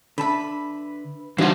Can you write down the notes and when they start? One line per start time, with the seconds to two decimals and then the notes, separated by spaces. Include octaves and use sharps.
0.18 D3 B4 E5 A5 B5
1.38 G2 E3 D#4 F#4 C5 C#5 F5 F#5